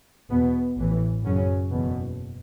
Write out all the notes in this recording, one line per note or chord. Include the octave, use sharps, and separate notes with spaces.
E2 B2 B3
A1 A2 E3
F#2 C#3 F#3 C#4
F#1 E2 B2